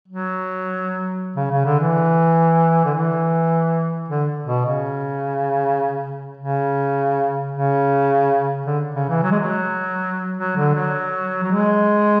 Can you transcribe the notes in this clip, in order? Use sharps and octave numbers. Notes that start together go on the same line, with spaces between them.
F#3
C#3
C#3
D3
E3
D3
E3
D3
B2
C#3
C#3
C#3
D3
C#3
E3
F#3
G#3
F#3
F#3
D3
F#3
F#3
G#3